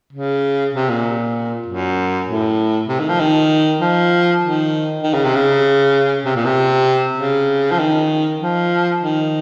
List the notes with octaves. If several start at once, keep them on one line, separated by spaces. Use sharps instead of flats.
C#3
C3
A#2
F#2
A2
C3
D#3
F3
D#3
F3
D#3
D#3
C#3
C3
C#3
C3
A#2
C3
C#3
F3
D#3
F3
D#3